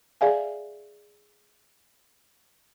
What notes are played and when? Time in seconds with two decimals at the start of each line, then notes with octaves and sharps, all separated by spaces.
0.21 G#4 D5 E5 F5 G#5